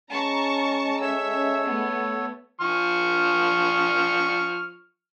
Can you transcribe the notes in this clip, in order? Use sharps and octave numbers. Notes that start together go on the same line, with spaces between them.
G#3 C#4 A5 A#5 C#6
A4 C#5 E5 E6
A3 B3
F3 C#6 F6